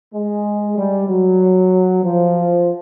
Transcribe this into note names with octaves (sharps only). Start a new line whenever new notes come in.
G#3
G3
F#3
F3